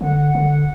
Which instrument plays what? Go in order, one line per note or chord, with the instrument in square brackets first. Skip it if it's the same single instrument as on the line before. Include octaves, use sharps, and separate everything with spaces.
[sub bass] D3 [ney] F#5
[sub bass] D3